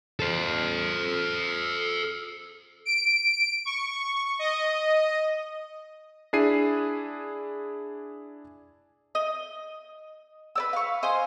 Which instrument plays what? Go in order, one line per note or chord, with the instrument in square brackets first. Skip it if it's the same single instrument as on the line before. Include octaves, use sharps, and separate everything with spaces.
[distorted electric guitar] A4 C5
[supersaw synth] D7
C#6
D#5
[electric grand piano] D4 E4 G#4 C7 D#7
[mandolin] D#5
B4 D5 E6
F5 C#6
C5 D#5 F5 G#5